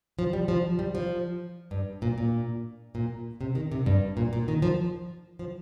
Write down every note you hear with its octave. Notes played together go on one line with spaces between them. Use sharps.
F3
G3
F3
G3
F3
G2
A#2
A#2
A#2
C3
D#3
C3
G2
A#2
A#2
D#3
F3
F3